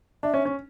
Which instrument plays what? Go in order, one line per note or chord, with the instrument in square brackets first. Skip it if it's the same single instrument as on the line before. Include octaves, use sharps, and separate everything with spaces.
[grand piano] D4 [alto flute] E5
[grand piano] C#4
C#4